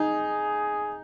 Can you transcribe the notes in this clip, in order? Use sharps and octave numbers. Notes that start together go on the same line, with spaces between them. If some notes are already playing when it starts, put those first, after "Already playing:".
Already playing: D#4 G#4